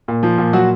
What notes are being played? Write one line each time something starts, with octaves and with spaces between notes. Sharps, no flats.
A#2
F3
A#2
F#3 F#4